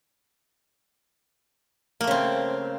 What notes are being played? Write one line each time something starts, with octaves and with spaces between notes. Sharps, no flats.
C#3 A3 A#3 C4